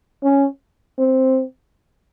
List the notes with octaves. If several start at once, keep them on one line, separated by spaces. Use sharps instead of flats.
C#4
C4